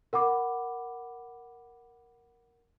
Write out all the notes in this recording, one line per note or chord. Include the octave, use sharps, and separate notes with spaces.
A#4 F#5 B5 D6